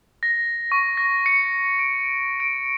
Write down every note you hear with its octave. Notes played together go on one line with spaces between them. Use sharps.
A#6
C#6
A#6
C#7
D7
D7